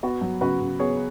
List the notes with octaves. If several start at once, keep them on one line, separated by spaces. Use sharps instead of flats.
B3 F#4
F#3
C#3 F#4 B4
C#3
B3 G#4 C#5